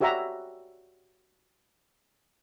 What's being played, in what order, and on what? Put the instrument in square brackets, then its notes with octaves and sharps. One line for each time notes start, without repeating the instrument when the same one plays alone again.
[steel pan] F#4 G4 C#5 E5 F#5 A#5